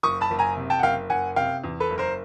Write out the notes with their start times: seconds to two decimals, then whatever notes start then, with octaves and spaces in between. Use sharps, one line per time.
0.03 F#1 C#6 D#6
0.21 A5 B5
0.31 F#1
0.39 G#5 A#5
0.57 C3
0.70 G5 A5
0.79 F#5
0.83 F#1 F5 G5
1.10 F#1 F#5 G#5
1.36 C3 F5 G5
1.64 E2
1.80 A4 B4
1.90 F#1
1.98 A#4 C5